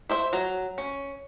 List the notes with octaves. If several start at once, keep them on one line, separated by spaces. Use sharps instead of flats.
E4 C5 E5
F#3
C#4